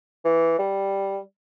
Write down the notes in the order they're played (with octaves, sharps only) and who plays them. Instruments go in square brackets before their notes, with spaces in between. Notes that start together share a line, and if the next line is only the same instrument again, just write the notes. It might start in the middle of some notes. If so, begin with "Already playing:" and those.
[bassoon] E3
G3